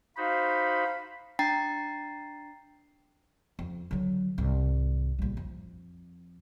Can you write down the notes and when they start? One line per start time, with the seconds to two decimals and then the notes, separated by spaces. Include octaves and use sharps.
0.17 D#4 F#4 C5 F5 B5
1.39 D4 G5 A#5 A6 C7
3.59 F2
3.91 D3 F#3
4.38 C2 G#2
5.19 A#1 G3
5.37 F2